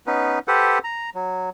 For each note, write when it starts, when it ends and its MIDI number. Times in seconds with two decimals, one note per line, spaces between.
0.07 0.39 59
0.07 0.39 61
0.07 0.39 63
0.07 0.39 71
0.48 0.79 67
0.48 0.79 69
0.48 0.79 71
0.48 0.79 72
0.48 0.79 78
0.84 1.10 82
1.15 1.50 54